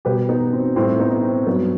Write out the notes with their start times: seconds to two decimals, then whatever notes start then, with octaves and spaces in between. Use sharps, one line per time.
0.05 B2 G3 G4 B4
0.29 B3 D#4
0.53 C4
0.76 A2 G3 C4
0.99 B3 D#4
1.11 D#4
1.23 C4
1.47 G2 F#3 B3